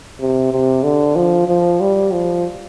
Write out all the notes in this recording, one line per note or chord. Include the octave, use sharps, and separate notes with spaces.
C3
C3
D3
F3
F3
G3
F3